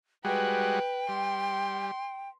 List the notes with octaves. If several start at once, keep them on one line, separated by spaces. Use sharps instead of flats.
G3 G#3 F#4 B4 G5
G3 C6